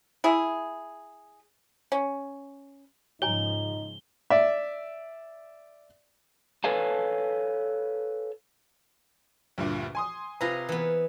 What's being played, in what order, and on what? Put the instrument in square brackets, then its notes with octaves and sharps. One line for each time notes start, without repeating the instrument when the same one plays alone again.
[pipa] E4 G#4
C#4
[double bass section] G#2 C#3 F3 [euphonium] D#4 [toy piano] C#5 G#5 A#5 [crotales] G7
[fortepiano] D5 E5
[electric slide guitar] A4 B4 C#5 F5 G#5 A5
[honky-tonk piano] D2 G2 A#2
G#5 C6 D#6
[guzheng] C3 G#4 A#5 [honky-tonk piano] F4 B4
[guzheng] E3 B3